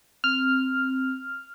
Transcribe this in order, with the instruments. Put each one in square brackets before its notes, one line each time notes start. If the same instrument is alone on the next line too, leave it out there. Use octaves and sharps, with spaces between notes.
[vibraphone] C4 [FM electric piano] F6